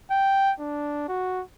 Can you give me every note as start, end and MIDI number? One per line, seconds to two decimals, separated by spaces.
0.11 0.52 79
0.60 1.07 62
1.09 1.42 66